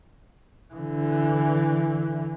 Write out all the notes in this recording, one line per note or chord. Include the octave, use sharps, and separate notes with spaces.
D3 E3